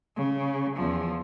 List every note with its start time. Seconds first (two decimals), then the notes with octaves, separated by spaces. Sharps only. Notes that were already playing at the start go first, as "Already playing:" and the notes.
0.17 C#3
0.77 E2 F3